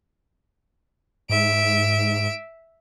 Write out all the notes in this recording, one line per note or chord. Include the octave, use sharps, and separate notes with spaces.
G#2 E5 D7